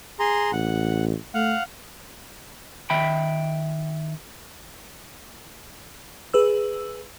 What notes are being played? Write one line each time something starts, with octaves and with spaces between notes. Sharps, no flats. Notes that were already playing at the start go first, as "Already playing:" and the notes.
G#4 A#5 C6
A1 F#5
A3 F5 F#5
D#3 E5 G5 B5
G#4 B4 E6